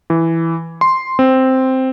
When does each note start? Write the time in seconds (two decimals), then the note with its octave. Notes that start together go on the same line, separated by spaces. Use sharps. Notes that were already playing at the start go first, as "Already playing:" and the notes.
0.10 E3
0.81 C6
1.19 C4